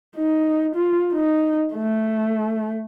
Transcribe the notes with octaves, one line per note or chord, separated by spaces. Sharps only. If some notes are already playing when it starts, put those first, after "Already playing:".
D#4
F4
D#4
A3